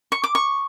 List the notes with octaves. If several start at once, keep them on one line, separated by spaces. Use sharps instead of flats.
C#6
D6
C#6